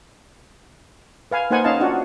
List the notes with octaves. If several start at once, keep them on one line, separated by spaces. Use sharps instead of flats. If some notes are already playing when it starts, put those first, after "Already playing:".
B4 F5 G#5
A#3 D#4 B4 C5 F#5 G#5
C#4 D#4 D#5 F5 A5
C#4 D4 F4 F#4 F#5